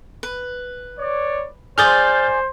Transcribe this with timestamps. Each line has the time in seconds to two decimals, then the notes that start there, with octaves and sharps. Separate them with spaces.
0.23 B4
0.99 C#5 D5
1.78 G#4 C5 D5 D#6 F6 G6 A6